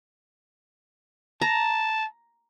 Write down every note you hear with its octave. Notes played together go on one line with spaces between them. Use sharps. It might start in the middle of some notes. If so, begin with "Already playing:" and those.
A5 A#5